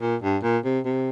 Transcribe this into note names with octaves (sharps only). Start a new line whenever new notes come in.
A#2
G2
A#2
C3
C3